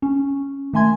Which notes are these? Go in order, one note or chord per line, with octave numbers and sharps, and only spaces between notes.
C#4
D#3 A3 E5 G#5 C6 G#6